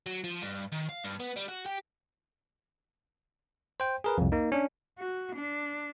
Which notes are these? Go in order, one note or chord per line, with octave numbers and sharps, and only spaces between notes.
F#3
F3
G2
D#3
F5
G2
B3
G3
F#4
G4
C5 G5
G#4 A#4 B4
C2 F2
A#3 D#4
C#4 D4
F#4
D4